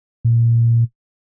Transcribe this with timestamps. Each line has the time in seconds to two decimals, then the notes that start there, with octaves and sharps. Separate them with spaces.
0.25 A#2